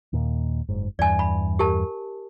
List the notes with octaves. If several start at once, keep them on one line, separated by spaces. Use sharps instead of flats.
D#2 A#2
F#1 G#2
E2 G2 D5 G#5
B5
G4 A#4 A5